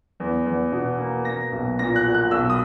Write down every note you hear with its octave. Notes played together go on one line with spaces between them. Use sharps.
E2
E2
B2
A#3
A#3 A#6
B1
A#2 A#6
F#6
F#3
F#6
B1 E6
D#6